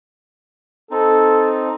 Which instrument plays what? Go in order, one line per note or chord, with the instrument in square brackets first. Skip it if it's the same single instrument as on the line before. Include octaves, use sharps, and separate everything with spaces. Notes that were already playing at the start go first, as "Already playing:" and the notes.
[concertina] C4 D#4 [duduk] A4